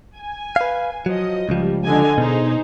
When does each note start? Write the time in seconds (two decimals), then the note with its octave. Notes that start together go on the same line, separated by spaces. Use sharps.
0.17 G#5
0.56 B4 F5
1.06 F3 F#3 D#5
1.49 C#2 F3 G3
1.84 D3 D#5 G#5
2.18 B2 D#4 G#4 C5